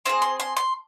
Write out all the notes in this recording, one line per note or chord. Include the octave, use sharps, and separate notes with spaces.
C4 F4 G#4 C5
C6
C6
C6